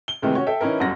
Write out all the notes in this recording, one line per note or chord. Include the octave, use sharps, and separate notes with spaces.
G7
C3 D#3 E3 G#3 A3
C#4 F#4 C#5
A4 E5 G5
E3 C#4 D#4 E4 A#4
G1 F#2 F#5 A#6